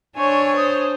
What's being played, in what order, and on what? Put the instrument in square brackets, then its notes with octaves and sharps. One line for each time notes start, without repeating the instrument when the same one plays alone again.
[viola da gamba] D4 C#5 [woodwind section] C5 E5 C#6 [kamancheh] G#5
[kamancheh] C5 [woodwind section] D#6